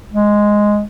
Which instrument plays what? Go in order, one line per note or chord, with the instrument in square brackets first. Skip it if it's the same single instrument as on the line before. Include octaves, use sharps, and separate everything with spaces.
[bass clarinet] G#3